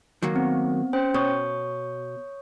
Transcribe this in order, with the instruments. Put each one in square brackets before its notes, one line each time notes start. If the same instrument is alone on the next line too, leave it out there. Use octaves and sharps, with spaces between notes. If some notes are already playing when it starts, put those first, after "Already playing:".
[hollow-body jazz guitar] D#3 F#3 A#3
[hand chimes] B3 C4
C#4 C5 G5
[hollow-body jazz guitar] B2 [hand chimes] C#5 C#6 D#6